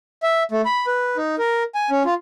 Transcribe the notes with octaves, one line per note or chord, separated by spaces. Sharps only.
E5
A3
B5
B4
D#4
A#4
G#5
C#4
F4